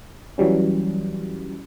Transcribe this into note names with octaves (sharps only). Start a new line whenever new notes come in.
E3 F#3 G3 C#4